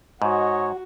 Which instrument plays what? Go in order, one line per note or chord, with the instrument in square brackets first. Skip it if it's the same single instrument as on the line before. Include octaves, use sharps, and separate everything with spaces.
[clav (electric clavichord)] G#2 [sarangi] F#4 [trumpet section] C#5 D#5